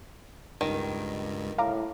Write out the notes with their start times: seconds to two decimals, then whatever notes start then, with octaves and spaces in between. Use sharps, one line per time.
0.61 C#2 G2 D#3
1.58 A2 F5 A#5 D6